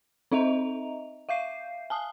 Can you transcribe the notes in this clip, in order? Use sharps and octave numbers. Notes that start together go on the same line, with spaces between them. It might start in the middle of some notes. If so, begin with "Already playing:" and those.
C4 D#4 D#5 E5 A#5 F7
E5 F5 G6 C7
G#5 A5 D#6